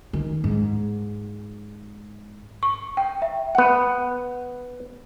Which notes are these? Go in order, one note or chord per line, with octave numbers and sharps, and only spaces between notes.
D#3
G#2
C#6
G5
E5
B3 F#5